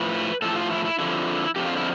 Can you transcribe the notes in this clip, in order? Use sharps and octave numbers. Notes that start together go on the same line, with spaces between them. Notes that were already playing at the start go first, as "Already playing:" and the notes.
Already playing: A2 F3 B4
A2 F3 A4
F4
E4
E4
F2 D3 F3 E4
F2 D3 F3 G4
F4
E4